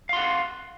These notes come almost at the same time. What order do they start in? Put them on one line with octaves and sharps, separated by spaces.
F5 C6 F#5